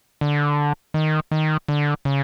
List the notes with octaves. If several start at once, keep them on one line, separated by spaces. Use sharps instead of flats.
D3
D#3
D#3
D3
C#3